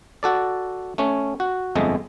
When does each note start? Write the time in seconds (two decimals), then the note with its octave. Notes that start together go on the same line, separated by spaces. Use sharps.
0.23 F#4 A4 D5
0.98 A3 C#4
1.40 F#4
1.75 G1 F2 G#3 A3 D#5